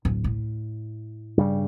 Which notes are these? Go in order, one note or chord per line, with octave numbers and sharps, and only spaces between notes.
D1
A2
G2 C#3 G3